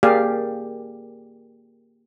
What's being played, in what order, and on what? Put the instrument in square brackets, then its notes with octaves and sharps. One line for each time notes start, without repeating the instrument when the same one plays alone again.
[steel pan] A#3 G4 G#4 D5 F5